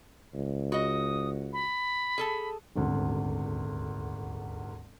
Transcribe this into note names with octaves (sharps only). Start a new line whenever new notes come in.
C#2
F#4 D#5 D#6
B5
G#4 A4 A5
D#1 G#1 D2